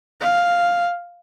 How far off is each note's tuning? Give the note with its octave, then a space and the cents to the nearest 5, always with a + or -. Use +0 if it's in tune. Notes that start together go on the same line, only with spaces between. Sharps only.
F5 +5